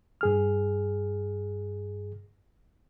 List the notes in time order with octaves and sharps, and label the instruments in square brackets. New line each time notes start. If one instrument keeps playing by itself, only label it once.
[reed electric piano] G2 G#4 F6